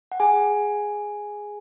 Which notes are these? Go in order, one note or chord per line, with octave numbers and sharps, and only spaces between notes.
F#5
G#4 G#5